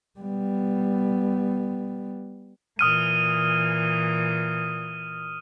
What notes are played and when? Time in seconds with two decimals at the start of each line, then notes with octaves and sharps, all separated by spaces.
0.19 G3 B3
2.79 A#2 E3 D#6 F6 D#7